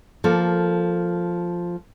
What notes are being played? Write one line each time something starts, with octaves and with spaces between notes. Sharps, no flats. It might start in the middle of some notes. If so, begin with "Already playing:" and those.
F3 A#3 A4